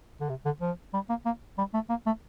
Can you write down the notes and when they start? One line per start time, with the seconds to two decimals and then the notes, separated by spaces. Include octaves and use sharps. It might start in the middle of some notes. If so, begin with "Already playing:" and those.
0.20 D3
0.29 C3
0.45 D3
0.61 F3
0.94 G3
1.09 A#3
1.26 A#3
1.58 G3
1.74 A3
1.89 A#3
2.06 A3